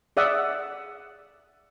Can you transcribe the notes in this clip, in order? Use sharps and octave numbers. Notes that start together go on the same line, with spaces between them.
G#4 D5 E5 F#5 D#6